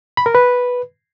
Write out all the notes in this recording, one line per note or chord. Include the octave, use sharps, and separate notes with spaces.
B5
A#4
B4